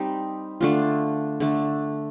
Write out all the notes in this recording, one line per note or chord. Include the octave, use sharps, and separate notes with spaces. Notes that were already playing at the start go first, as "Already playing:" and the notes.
Already playing: G3 C4 D#4
D3 A3 D4 F4
D3 A3 D4